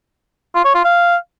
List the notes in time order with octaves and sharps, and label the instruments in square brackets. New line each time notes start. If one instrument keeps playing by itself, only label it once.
[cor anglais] F4
C#5
F4
F5